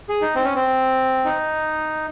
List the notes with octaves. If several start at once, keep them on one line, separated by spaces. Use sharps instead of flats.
G#4
D#4
C4
C#4
C4
D#4